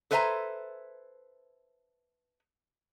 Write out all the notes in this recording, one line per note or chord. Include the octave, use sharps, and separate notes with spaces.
A4 B4 C5 E5 G#5 A#5